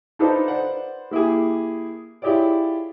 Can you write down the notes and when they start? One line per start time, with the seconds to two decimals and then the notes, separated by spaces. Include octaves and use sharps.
0.19 D4 D#4 F4 A4 B4 C5
0.48 B4 C5 D5 F#5
1.11 A#3 E4 G4 G#4
2.22 E4 F4 G4 G#4 C#5 D5